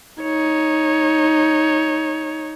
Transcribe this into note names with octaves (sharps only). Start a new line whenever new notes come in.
D#4 C#5